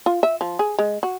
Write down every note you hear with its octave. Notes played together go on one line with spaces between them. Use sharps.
F4
E5
F3
G#4
G#3
F#4